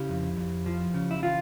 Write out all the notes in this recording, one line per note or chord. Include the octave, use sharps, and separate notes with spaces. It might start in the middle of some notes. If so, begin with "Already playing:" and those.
Already playing: C#3 E4 G4
F2
F2
F3
C#3
E4
E3 F4